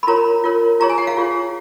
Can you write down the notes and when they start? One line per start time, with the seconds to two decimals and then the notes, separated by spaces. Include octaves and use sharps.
0.03 B5
0.07 F4 A#4 C#5 A#5
0.44 F4 A#4 C#5
0.80 F4 G#4 C#5 A#5
0.90 G#5
0.98 F#5
1.07 F5
1.17 F4 G#4 C#5